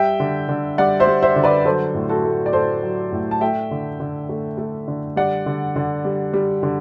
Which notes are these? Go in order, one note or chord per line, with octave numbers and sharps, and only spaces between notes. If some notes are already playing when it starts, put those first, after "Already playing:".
Already playing: G3 E5 G5
D3
D3
G3 D5 F#5
C5 E5
G3
C5 E5
D3
B4 D5
F#3 A4 C5
A2
F#4 A4
A3
D5
A2 A4 C5
F#3
A2
A5
A3 E5 G5
D3
D3
A3
A3
D3
G3 D5 F#5
D3
D3
G3
G3
D3